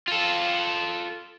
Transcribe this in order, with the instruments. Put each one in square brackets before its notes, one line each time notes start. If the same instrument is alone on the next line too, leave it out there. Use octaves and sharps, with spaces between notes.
[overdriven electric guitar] F4 A4